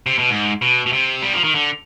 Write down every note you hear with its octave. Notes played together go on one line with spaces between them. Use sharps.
C3
B2
G#2
B2
B2
C3
G3
F3
D#3
D3